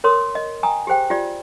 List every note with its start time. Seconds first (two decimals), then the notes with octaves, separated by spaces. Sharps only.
0.04 A#4 C#5 C6 D#6
0.35 D#5
0.63 G5 G#5 A#5 D#6
0.87 G4 G#4 C5 G5
1.10 F4 G4 D5